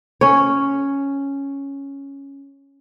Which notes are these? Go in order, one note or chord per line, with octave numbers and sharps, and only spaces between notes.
C#4 C#5